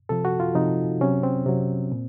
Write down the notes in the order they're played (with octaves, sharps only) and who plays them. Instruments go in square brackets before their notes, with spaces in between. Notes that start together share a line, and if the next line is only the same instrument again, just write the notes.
[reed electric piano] C3 F3 A4
F#4
F4
C3 F3 D#4
C3 F#3 C#4
C4
C3 F#3
A#2